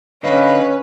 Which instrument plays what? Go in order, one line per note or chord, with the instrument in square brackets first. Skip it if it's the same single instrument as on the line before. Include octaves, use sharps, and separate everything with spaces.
[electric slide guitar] D3 D#5 F5 [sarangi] C#4 [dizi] B4